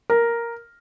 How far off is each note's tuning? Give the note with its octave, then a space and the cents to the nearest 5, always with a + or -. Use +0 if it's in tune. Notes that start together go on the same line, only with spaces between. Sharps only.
A#4 +0